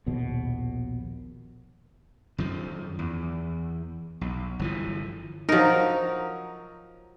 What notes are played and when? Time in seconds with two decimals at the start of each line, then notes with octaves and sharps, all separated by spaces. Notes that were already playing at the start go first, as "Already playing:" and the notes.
0.06 A#1 D#2 B2
2.38 F#2 D#3 F3
2.99 E2
4.21 B1
4.59 G1 E3 F3
5.49 F3 F#3 D#4 A#4